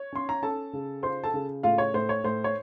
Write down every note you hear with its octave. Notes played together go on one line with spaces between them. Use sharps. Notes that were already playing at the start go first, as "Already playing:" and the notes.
Already playing: C#5
C#4 C6
A#5
C#4 A4 A5
C#3
F4 C5 C6
A4 A5
C#3
A2 F4 F5
C#5
A2 C5
C#5
A2 C5
C#5